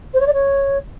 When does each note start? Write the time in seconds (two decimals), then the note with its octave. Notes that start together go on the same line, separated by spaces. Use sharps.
0.13 C5
0.20 C#5
0.27 D5
0.33 C#5